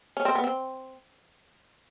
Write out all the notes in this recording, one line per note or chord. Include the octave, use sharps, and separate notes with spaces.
C#4
C4
B3
C4